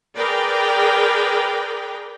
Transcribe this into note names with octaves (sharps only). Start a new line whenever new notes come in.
G#4 A#4 B4 D5 G5